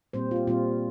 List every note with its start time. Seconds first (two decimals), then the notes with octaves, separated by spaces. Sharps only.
0.13 A#2 G3 C4 C5
0.31 F4
0.36 G4
0.47 A#2 G3 C4 F4